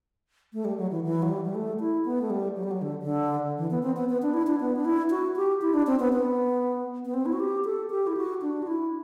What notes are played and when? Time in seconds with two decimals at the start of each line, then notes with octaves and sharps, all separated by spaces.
0.53 A3
0.65 G3
0.78 F#3
0.91 E3
1.04 E3
1.22 F#3
1.29 G3
1.44 G3
1.55 A3
1.80 E4
2.05 B3
2.22 A3
2.30 G3
2.56 F#3
2.63 G3
2.71 F#3
2.82 D3
3.02 D3
3.58 E3
3.71 B3
3.83 C4
3.97 B3
4.09 B3
4.22 D4
4.34 E4
4.47 D4
4.60 B3
4.76 D4
4.85 E4
5.10 F#4
5.36 G4
5.61 E4
5.74 D4
5.87 C4
5.99 B3
6.13 B3
7.05 B3
7.14 C4
7.26 E4
7.33 F#4
7.40 G4
7.65 A4
7.90 G4
8.07 E4
8.17 F#4
8.42 D4
8.63 F#4
8.67 E4